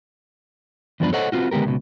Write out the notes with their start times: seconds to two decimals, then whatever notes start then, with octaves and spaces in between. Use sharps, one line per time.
1.00 E2 G2 F3 B3 D4 B4
1.13 A4 C5 C#5 D#5 F#5
1.32 B3 C4 F4 F#4
1.51 D3 G#3 B3 G4 A#4
1.66 C#2 B2